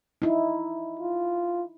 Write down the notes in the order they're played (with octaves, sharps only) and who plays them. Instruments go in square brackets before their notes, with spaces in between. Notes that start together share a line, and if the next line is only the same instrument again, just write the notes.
[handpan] D#4 E4
[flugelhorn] F4